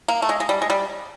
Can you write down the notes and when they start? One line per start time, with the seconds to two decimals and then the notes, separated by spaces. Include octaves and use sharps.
0.08 A#3
0.22 A3
0.29 G#3
0.40 G#3
0.49 G3
0.62 G#3
0.70 G3